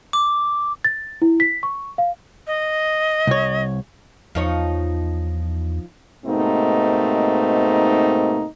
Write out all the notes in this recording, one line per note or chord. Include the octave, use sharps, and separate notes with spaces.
D6
A6
E4
B6
C#6
F5
D#5
C2 C#5
E2 F3 D#4 C#5
G#2 B2 A3 A#3 C4 D#4